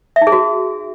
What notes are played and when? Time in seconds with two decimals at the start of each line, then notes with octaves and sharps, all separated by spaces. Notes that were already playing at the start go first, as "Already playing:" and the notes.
0.16 E5
0.21 D#4
0.27 G#4
0.32 F#4